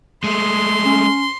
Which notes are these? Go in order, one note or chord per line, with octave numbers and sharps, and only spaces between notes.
G#3 A3 C6
C#4